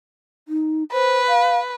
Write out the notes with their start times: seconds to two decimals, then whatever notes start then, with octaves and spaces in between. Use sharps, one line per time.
0.48 D#4
0.93 B4 C5
1.28 F5